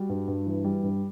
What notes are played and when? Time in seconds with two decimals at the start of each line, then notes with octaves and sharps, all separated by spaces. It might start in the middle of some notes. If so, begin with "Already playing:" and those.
Already playing: G3 F#4
0.09 G2
0.27 G2
0.46 E3
0.64 G3
0.83 G2